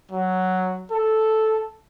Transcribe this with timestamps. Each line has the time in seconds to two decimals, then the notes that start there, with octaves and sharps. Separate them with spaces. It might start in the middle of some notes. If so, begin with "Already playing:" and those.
0.11 F#3
0.91 A4